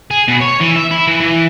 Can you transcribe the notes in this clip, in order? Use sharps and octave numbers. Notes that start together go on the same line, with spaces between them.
G#4
B2
C#5
E3
E5
E4
E3
E3